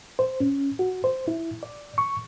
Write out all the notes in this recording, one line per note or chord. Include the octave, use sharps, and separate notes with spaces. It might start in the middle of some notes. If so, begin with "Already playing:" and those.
C5
C#4
F#4
C5
E4
D5
C#6